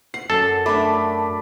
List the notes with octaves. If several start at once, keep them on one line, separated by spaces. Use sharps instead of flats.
F#5 C7
F#2 A4
A3 D4 A5 B5 D6